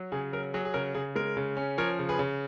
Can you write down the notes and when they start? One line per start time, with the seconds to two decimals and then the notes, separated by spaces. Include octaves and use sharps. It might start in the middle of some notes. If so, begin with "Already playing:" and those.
Already playing: F#3
0.12 C#3 G#4
0.33 F#3 A#4
0.54 F#3 G#4
0.65 G#4
0.74 C#3 A#4
0.94 C#3 G#4
1.16 G#3 A#4
1.37 C#3
1.57 C#4
1.78 F3 A#4 C#5
1.99 C#3
2.09 G#4 B4
2.19 C#3